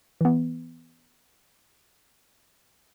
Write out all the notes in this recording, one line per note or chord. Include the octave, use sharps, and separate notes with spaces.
E3 B3